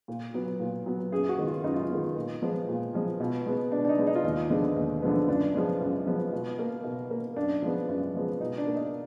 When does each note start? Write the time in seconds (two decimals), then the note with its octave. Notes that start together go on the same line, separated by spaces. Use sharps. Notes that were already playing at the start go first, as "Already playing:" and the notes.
0.08 A#2
0.34 F#3 B3
0.60 A#2
0.86 F#3 B3
1.12 F#2 G#4
1.29 F#4
1.38 D#3 G#3 B3
1.47 F4
1.64 F#2 D#4
1.74 F4
1.83 D#4
1.90 D#3 G#3 B3
2.15 A#2
2.42 F3 G#3 B3
2.69 A#2
2.94 F3 G#3 B3
3.20 B2
3.46 G#3 B3
3.72 B2 D4
3.85 D4
3.89 D#4
3.98 G#3 B3
4.07 D#4
4.15 F4
4.24 D#2 D#4
4.50 D3 F3 G#3 B3
4.76 D#2
5.02 D3 F3 G#3 B3
5.28 F#2 D4
5.54 F3 G#3 B3
5.80 F#2
6.07 F3 G#3 B3
6.32 B2
6.59 A#3
6.84 B2
7.10 A#3
7.36 F#2 D4
7.62 F3 G#3 B3
7.89 F#2
8.14 F3 G#3 B3
8.41 B2 D#4
8.58 D4
8.67 A#3
8.75 D#4